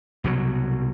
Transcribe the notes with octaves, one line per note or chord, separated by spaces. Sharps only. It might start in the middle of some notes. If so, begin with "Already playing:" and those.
C2 B2 D3 F#3